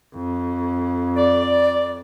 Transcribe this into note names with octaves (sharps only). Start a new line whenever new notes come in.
F2
D5